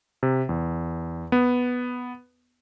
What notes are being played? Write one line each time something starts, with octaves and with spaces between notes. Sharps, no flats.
C3
E2
B3